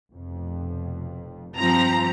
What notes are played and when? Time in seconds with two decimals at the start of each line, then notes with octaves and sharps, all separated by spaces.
0.12 F1 F2 B2
1.58 G2 F3 C4 A#5